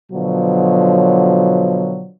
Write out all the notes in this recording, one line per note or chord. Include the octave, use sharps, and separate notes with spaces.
B2 D3 F3 F#3